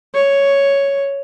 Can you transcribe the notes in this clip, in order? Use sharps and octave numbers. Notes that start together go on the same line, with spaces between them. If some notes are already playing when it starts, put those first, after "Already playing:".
C#5